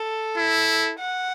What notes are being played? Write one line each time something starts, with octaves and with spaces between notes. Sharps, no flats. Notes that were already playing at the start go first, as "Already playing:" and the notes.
Already playing: A4
E4
F#5